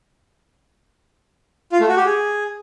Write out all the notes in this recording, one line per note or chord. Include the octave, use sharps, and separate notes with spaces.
F4
A3
F#4
G4
G#4